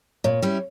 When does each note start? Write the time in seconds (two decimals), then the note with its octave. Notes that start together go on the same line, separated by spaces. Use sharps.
0.24 A#2 C#5
0.42 G3 C#4 E4